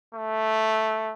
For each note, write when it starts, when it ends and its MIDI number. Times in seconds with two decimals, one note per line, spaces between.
0.15 1.13 57